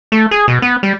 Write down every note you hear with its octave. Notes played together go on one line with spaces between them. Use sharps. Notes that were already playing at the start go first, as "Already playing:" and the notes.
A3
G#4
B2
B3
G3